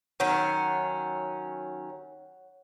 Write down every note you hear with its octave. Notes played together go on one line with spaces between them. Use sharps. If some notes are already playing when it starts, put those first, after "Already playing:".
D#3 F#3 C#4 C#5 F#5